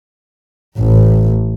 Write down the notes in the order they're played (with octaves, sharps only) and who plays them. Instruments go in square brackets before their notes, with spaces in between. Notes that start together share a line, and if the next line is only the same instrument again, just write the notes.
[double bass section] A1